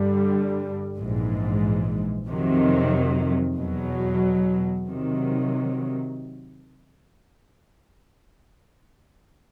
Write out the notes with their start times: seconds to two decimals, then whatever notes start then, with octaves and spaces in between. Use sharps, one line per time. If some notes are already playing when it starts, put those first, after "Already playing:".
Already playing: G2 D3 G3
0.97 A#1 G#2 E3
2.28 F2 C3 D#3 F#3
3.57 E2 B2 F#3
4.88 C3 D#3 F#3